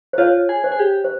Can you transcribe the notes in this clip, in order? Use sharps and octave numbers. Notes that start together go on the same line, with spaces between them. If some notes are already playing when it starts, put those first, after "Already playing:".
C5
F4 C#5
G#4
C5
G#4
G4
C5